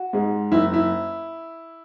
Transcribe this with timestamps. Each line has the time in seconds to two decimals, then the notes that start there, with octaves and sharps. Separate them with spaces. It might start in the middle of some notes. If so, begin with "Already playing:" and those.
Already playing: F#4
0.13 G#2 G#3
0.52 F#1 E4
0.74 E4